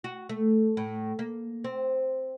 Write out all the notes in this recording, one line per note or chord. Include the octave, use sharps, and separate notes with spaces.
F#4
A3
A2
A#3
C4